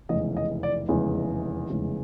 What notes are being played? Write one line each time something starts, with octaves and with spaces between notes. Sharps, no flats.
F1 E2 C#3 E3 G#3 D#5
D#5
D5
F1 E2 C#3 E3 G#3
F1 E2 C#3 E3 G#3